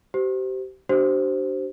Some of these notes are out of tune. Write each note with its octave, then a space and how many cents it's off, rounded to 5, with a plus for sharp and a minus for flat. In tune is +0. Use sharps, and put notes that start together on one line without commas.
G4 -30 C5 -25
D4 +10 G4 -40 C5 +0